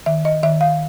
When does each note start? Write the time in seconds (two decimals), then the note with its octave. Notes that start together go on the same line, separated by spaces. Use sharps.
0.06 D#3 E5
0.25 D#5
0.43 D#3 E5
0.61 F5